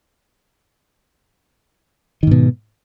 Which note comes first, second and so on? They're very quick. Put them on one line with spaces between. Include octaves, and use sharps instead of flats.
D#3 G#2 B2